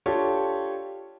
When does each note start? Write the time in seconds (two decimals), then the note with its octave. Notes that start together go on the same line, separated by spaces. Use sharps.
0.06 D4 F4 G4 A4 C#5